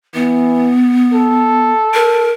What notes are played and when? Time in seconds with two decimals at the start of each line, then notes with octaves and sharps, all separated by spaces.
0.14 E3 B3
1.13 A4
1.94 A#4